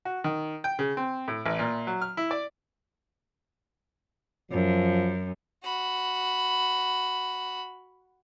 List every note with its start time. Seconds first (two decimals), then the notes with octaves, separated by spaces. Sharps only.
0.05 F#4
0.24 D#3
0.64 G5
0.79 C#3
0.97 C4
1.28 A2
1.46 A1
1.59 A#2
1.87 F#3
2.02 F6
2.17 E4
2.31 D5
4.52 F#2 F3
5.65 F#4 B5